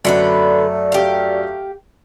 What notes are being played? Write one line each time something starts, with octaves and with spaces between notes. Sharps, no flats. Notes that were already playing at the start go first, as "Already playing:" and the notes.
F#2 D3 F#3 A3 B3 B4 D5
G4 F5